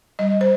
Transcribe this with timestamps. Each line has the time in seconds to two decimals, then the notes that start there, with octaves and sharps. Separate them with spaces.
0.19 G3 D#5
0.41 C5